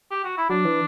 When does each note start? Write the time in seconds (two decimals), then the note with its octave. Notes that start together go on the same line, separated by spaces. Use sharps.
0.11 G4
0.24 F#4
0.37 E4
0.49 F#3 D4
0.65 E3